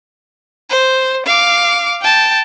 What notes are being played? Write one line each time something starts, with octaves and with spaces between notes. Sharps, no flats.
C5
F5 D6
G5 A5